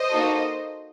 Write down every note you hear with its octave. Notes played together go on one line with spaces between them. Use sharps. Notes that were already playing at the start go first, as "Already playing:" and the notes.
Already playing: C5 D#5
A#3 D#4 F#4 A4